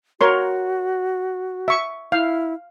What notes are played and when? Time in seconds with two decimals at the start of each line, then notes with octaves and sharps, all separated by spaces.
0.21 F#4 A#4 C#5 C6
1.68 E5 C#6
2.12 E4 F5